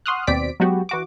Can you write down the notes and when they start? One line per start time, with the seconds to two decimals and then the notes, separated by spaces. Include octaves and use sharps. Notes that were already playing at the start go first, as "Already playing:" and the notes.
0.06 F#5 C6 C#6 D#6 F6 F#6
0.27 D#2 B2 C4 D5 B6 D7
0.60 F#3 G#3 B3 F#4 G4
0.89 E3 F#4 D6